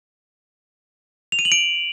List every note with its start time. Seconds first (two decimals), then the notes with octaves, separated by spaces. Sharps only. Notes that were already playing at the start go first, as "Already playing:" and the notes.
1.32 F7
1.39 D#7
1.45 F#7
1.52 D7